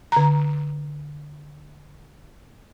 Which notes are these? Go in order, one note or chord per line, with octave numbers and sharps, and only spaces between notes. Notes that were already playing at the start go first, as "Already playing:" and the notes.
D3 A#5